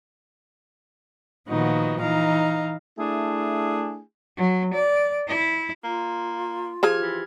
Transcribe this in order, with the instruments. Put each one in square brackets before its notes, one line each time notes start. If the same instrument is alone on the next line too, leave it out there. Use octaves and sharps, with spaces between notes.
[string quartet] A#2 D#3 F3 B3 D#4 F#4
E3 D#4 F5 A#5
[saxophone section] A3 D4 E4 G#4
[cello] F#3
D5
E4
[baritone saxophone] A#3 [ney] F4
[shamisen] F3 G#4 A#5 [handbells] G4 F6 G#6
[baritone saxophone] E3